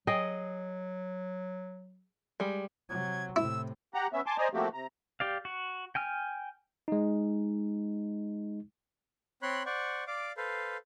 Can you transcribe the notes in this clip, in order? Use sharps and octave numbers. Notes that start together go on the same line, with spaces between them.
F#3 G#4 D#5 G5
G3 G#3
C3 F#3 G#6
A2 C3 E4 E6
G4 F#5 A#5
B3 C#4 E5
G#5 A5 C6 D6
C5 D5 D#5 G#5 A#5
F3 A3 A#3 C4 F#4 G4
C3 A#5
G4 D5 F5
F#4
G5 G#5 F6
G#3 D#4
C4 C#5 B5 C6 F#6
C5 D5 F#5 C#6
D5 F5 D6
A4 B4 C5 F5